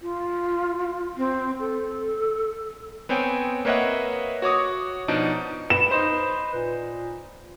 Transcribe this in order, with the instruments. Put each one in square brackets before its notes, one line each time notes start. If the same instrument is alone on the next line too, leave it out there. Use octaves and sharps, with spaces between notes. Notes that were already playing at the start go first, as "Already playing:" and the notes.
[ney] F4
C4
A4
[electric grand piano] B3 C4 C#5 G5 G#5
A#3 B4 C#5 D#5 E5 F#5
F#4 C#5 D6 D#6
B2 F3 D4 D#4 D7
[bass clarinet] B4 [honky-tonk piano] E7
[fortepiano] D#4 C5
[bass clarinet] A#2